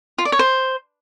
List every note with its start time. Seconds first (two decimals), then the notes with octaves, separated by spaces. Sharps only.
0.18 F4
0.25 D5
0.32 C#5
0.39 C5